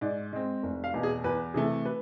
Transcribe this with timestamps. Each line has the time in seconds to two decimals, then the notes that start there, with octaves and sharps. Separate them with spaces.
0.01 G#2 D5
0.33 G#3 C4
0.63 F1
0.84 F5
0.94 E2 B2
1.03 G#4
1.24 E2 B4
1.54 C3 E3 A3 G#4
1.85 B4